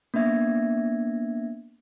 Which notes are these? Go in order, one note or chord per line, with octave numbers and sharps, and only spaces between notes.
A#3 B3 D4 E5 G#6 A#6